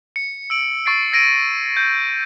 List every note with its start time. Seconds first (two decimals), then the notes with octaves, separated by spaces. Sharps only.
0.16 C#7
0.50 E6 D7 F#7
0.86 C#6 A6 C7 D7
1.12 E6 G#6 A#6 D7 D#7
1.77 G6